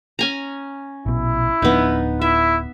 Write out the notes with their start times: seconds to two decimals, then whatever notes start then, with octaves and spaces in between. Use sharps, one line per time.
0.19 C#4 G#5 A#5
1.06 A#1 B2 E4
1.62 D1 F3 B3 D4 D#4
2.21 E4 E5